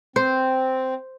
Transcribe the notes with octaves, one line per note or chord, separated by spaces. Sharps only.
C4 C5